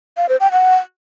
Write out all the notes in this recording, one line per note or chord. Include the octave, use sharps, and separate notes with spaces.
F5
C5
G5
F#5